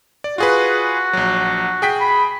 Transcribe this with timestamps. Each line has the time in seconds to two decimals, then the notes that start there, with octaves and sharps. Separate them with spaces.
0.24 D5
0.38 F4 F#4 G#4 B4
1.13 A#1 F#3
1.82 G#4 G5 B6
2.00 B5